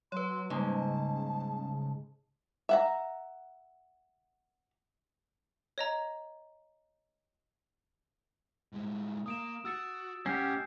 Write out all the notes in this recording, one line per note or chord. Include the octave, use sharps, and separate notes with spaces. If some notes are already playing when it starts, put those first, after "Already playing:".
F#3 B4 C#5 C6
G#2 C#3 G3 A#3 A5
E5 F#5 A#5
C#5 D#5 A#5
A2 G#3
A#3 D#6 D7 E7
F#4 E6 A6 C#7
A2 C#4 G4 F#5 F6 G6 C7